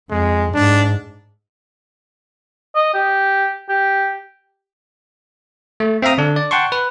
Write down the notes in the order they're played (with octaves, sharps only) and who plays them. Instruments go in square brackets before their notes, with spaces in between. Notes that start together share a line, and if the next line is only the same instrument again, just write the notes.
[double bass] F2 [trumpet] G#3
[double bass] G#2 [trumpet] D4
[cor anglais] D#5
G4
G4
[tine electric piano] A3
C4 E5 F5 A#5 D#6
D3 D4
D5
F#5 G5 A5 C6 C#6
B4